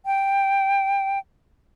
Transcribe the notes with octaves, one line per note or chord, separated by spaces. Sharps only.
G5